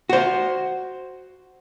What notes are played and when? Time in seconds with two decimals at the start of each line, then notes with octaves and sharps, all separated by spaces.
0.09 F#4 C5